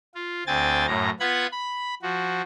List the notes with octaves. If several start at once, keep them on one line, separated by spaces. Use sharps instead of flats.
F4
D2 C4 G5 G#5 A6
F#2 A2 A#5
B3 F4 F#5 B5 G#6
B5
F3 F#4